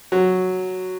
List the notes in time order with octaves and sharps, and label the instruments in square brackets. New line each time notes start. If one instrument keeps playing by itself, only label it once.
[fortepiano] F#3